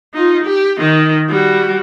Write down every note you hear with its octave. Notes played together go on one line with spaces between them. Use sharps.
D#4 F4
G4
D#3 D#4
G3 F#4